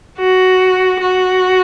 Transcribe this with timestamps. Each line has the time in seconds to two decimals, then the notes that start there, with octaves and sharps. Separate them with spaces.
0.19 F#4
1.02 F#4